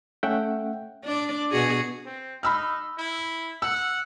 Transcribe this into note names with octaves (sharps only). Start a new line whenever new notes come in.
A3 C#4 E5 F#5 G5
D4 D5
B2 F#4 G#4
C4
D#4 B5 E6 F6
E4
F#5 E6